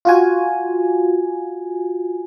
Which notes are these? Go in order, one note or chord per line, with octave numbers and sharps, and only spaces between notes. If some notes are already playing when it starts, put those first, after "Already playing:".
F4 F#4 G#5